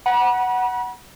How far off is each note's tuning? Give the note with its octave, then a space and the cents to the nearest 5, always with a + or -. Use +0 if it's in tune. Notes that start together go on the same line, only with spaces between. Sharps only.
F#5 +5 B5 -40